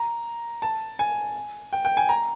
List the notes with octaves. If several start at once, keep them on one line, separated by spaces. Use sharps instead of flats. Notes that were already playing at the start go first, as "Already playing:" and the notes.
Already playing: A#5
A5
G#5
G5
G5
G#5
A#5